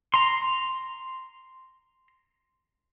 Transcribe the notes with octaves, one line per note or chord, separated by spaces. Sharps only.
A#5 C6